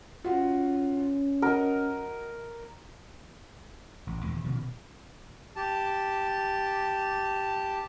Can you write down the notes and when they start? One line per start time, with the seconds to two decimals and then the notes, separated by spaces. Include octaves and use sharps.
0.24 C#4 F4 F#4
1.42 F#4 A#4 D#5
4.07 A1
4.23 D#1 E2 D3
4.44 B2 D#3 F3
5.56 G4 A5